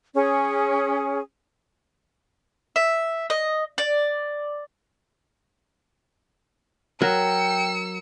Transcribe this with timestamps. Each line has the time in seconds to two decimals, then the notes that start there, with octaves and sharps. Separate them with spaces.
0.14 C#4 G#4
2.76 E5
3.30 D#5
3.78 D5
7.02 F#3 A#4 G5 E6 C#7